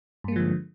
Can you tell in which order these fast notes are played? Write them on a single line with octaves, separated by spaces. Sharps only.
G2 A#3 G#3 F3 D3